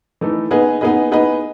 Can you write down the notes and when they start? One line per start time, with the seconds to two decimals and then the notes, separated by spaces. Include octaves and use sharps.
0.21 E3 A3 D#4 A4
0.51 B3 D#4 G#4 B4 D#5
0.81 B3 D#4 G#4 B4 D#5
1.11 B3 D#4 G#4 B4 D#5